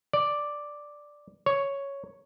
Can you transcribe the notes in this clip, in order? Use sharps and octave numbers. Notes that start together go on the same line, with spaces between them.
D5
C#5